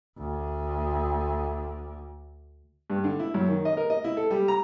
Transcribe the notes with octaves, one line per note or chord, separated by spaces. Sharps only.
D2 D3
G2
D3
E4
F#2
D#3
D#5
A#4
D#5
E4
A4
G3
A#5